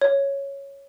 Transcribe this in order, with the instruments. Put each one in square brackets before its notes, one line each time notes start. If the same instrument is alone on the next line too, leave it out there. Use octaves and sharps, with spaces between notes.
[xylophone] C#5